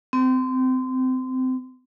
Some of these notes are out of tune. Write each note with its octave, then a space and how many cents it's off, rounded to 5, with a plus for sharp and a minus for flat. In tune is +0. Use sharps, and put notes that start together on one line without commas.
C4 -25